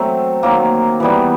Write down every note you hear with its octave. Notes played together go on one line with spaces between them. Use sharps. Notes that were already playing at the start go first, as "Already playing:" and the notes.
Already playing: F#3 A3 C4
D#3 F#3 A#3
E3 G3 B3